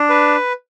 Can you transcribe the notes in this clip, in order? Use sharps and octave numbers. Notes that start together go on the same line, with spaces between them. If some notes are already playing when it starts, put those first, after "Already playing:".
Already playing: D4
B4